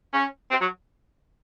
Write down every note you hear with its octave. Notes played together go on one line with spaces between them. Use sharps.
C#4
C4
F#3